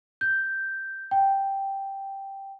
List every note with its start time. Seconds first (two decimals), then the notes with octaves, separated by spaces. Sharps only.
0.21 G6
1.11 G5